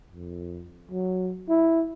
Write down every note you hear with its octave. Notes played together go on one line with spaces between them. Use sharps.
F2
F#3
E4